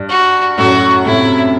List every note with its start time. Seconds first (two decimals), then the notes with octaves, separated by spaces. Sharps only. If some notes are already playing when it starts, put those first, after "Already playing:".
Already playing: G2
0.09 F#4
0.58 F#2 A2 F#4
1.06 A2 C3 E4